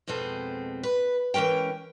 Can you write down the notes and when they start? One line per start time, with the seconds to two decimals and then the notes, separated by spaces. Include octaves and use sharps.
0.07 F2 B2 G#3 C4 A4
0.83 B4
1.34 E3 G#3 C#4 A#4 G5